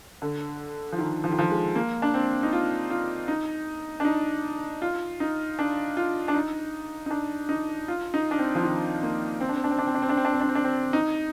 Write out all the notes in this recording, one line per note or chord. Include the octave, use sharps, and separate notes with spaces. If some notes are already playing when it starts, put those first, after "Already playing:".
D3
F3
D#3
F3
D#3
F3
G#3
A#3
D4
C4
D#4
F4
F4
D#4
D4
D#4
F4
D#4
D4
F4
D4
D#4
D#4
D4
D#4
F4
D#4
D4
C4
F3
D#3
A#3
C4
D4
C4
D4
C4
D4
C4
D4
C4
D4
C4
D4
C4
D4
C4
D4
C4
D#4